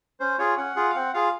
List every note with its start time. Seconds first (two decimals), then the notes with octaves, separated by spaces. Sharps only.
0.20 C#4 C5
0.39 F4 G#4 C#5
0.57 C#4 F#5
0.76 F4 G#4
0.89 F5
0.95 C4 F#5
1.14 F4 G#4 F5